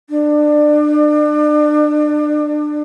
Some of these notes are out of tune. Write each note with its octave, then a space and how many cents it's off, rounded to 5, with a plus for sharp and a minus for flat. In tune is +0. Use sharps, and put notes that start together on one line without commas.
D4 +30